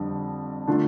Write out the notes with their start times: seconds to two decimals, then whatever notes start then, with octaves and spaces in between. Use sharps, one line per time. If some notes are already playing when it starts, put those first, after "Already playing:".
Already playing: F2 D3 G3 D4
0.67 D3 A3 D4 F4